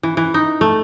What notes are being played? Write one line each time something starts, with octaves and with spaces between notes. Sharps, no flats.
E3
E3
D#4
A3